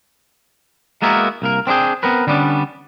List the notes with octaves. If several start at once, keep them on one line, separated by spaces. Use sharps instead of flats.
G#3 A#3 B3 E4 F#4 A#4
C2 A#3 A#4
C4 D4 D#4 G#4 G5
B3 C4 A#4 B4
D3 G3 B3 C#4 D4